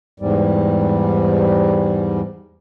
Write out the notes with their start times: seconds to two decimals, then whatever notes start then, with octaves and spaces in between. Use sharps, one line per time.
0.20 E2 G#2 G3